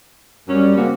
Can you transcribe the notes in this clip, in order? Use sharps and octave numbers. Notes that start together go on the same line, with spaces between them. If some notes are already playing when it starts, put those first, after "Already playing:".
F#2 G3 C#4
C#3 A#3 C4 F#4